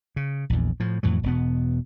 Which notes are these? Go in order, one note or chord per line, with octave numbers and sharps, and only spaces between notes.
C#3
A#1 E2
A2 F3
F2 A2 E3 F#3
E1 B2 B3